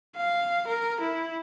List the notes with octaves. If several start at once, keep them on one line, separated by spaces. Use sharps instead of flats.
F5
A#4
E4